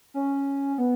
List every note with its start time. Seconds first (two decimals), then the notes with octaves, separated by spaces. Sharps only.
0.14 C#4
0.78 B3